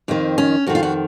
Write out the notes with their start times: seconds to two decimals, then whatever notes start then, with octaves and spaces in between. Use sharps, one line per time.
0.08 F2 D#3 C4
0.38 C#4
0.66 F2 D#3 F#4
0.75 F4
0.83 F#4